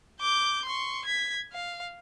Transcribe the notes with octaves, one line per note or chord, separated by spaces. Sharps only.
D6 G6
C6 C#6
G#6 B6
F5